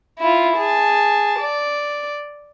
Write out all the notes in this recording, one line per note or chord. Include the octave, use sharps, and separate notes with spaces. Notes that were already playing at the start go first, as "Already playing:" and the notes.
E4 F4
G#4 A5
D5